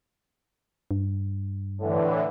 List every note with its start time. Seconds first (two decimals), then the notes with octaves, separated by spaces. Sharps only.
0.91 G2
1.78 A2 D3 E3